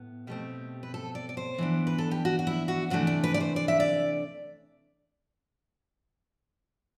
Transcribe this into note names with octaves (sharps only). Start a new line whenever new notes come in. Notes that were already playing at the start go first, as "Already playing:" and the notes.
Already playing: A2 B3
B2 A3 C4 G4
B4
A4
D5
D5
C5
E3 B3 D4
B4
A4
G4
F#4
F#4
E4
F#4
C3 E3 A3 D4 F#4
D5
B4
D5
C5
D5
E5
D5